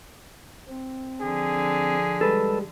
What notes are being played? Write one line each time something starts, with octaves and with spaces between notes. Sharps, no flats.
C4
D3 F3 G#4
G3 G#3 A4 B4